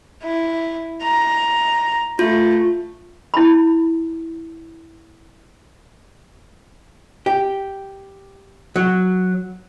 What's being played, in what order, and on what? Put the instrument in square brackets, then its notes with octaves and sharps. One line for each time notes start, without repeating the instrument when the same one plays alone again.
[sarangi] E4
A#5
[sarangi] A3 [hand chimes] F4
[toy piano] E4 B5
[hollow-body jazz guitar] G4
F#3